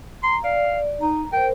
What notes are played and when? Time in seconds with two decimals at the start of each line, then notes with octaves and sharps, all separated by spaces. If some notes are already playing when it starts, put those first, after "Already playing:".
0.23 A#5 C6
0.44 D5 F5
1.01 D#4 A#5
1.32 A#4 C5 G5